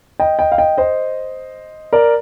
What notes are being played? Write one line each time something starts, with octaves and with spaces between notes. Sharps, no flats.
D#5 G5
D#5 G5
F5
D#5 G5
C5 D#5
A#4 D5